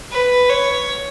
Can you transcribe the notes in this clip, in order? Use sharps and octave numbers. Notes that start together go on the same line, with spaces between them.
B4
C#5